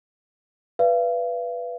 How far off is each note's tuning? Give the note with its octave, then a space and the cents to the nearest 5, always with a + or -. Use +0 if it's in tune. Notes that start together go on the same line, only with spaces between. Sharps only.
B4 -5 D5 +10 F5 -40